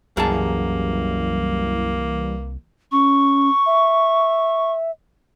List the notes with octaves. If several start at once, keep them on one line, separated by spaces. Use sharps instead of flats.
C2 F#2 E3 G3 A#3 G#4 A5
C#4 C#6
E5